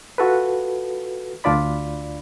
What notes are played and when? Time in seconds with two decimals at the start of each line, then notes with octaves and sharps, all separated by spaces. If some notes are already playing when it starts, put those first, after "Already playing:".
0.18 F4 F#4 A4 B4
1.44 D2 D4 F4 D5 B5